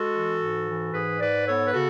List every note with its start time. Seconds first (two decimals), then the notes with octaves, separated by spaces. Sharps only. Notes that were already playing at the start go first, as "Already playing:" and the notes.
Already playing: G#3 F#4 A4
0.13 E3
0.40 G#2
0.67 E3
0.93 G#2 G#4 B4
1.20 G#2 B4 D5
1.47 B3 A4 C#5
1.64 B4
1.74 C#3 F#4 A4